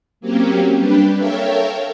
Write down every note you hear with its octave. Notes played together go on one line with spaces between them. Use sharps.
F#3 A#3 C4 C#4 G4
G3 D4 G4 B4
A4 A#4 C#5 E5 F5 G5